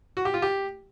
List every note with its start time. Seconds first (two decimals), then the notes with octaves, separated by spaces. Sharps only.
0.17 F#4
0.25 G4
0.34 F4
0.42 G4